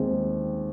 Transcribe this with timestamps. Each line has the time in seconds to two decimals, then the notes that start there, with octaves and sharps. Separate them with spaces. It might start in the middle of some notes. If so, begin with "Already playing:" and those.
Already playing: D#2 D#3 G#3 C4